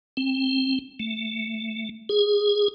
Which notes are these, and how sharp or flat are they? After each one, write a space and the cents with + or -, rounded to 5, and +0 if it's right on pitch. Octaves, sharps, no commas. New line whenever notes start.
C4 +20
A3 +10
G#4 -10